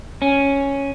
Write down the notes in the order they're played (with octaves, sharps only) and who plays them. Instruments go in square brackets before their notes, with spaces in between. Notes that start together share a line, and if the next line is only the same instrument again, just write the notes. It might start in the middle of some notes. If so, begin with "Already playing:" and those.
[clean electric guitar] C#4